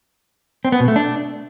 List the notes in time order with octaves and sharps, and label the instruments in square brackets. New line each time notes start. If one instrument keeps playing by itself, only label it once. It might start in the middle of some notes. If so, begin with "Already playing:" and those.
[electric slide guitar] C4
B3
B2
A3
D4